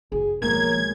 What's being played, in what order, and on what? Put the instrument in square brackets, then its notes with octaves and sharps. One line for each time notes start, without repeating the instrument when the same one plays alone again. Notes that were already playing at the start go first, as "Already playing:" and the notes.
[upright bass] F#1 [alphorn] G#4
[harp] B1 G#3 [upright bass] F3 A#3 [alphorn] A#4 [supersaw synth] G#6